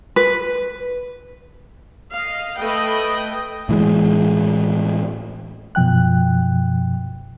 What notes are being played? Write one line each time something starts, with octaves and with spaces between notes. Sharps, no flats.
B4
D#5 F5
A3 B4 D#5 G5
A2 E3 G#3
F#2 B2 F3 G5 F#6